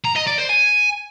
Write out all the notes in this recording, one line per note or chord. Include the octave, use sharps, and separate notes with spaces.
A#5
D#5
D5
C5
G#5